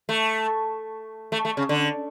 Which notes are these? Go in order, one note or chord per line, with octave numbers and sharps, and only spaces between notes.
A3
A3
A3
C#3
D3